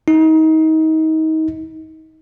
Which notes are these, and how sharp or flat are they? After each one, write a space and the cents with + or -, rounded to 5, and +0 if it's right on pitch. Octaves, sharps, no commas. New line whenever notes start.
D#4 +30